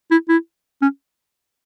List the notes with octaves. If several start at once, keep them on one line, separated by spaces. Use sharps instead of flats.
E4
E4
C#4